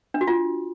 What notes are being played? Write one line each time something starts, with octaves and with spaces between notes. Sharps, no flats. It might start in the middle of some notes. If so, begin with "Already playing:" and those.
D4
F#4
F4